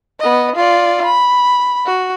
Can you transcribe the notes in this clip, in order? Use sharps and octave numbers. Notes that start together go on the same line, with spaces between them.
B3 D#5
F4 D5
B5
F#4